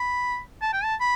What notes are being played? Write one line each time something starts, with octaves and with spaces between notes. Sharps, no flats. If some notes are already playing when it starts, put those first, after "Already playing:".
Already playing: B5
A5
G5
A5
B5